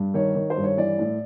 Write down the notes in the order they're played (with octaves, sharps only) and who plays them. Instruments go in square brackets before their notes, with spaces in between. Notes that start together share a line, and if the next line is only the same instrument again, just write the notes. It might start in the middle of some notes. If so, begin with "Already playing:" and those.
Already playing: [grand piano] G2
D#3 C#5
D#3
C5
G2
C#5
E3 D5
A2